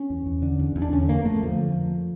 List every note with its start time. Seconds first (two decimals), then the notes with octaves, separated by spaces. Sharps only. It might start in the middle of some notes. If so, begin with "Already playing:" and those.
Already playing: C#4
0.10 E2
0.26 E2
0.42 D3
0.59 E2
0.76 E2
0.82 D4
0.92 D3 C#4
1.09 F2 A#3
1.25 F2 A3
1.42 D3 F3